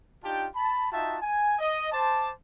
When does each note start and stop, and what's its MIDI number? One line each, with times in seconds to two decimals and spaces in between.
0.23 0.48 62
0.23 0.48 63
0.23 0.48 65
0.23 0.48 67
0.23 0.48 79
0.23 0.48 81
0.55 0.89 81
0.55 0.89 83
0.92 1.18 63
0.92 1.18 65
0.92 1.18 66
0.92 1.18 76
0.92 1.18 79
0.92 1.18 81
1.22 1.58 80
1.59 1.88 75
1.92 2.32 72
1.92 2.32 81
1.92 2.32 86